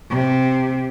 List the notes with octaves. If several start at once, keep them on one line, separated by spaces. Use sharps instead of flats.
C3